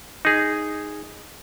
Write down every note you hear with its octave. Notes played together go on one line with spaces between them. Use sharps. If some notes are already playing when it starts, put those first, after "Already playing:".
D#4 G#4